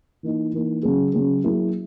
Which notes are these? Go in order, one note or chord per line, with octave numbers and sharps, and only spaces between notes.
E3 A#3 D#4
E3 A#3 D#4
C#3 F#3 C#4 G#4
C#3 F#3 C#4 G#4
F#3 A#3 E4 G#4